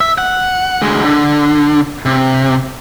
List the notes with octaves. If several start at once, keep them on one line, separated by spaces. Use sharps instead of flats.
E5
F#5
D2 G#3
D3
C3